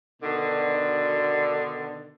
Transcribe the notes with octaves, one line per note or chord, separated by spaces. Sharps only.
B2 D3 D#3